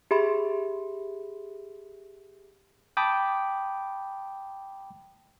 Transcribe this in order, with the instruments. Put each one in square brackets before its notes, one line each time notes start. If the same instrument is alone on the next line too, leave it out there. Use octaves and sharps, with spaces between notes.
[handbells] G4 G#4 E5 B5 C6
[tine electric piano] G5 A5 B5 D6 D#6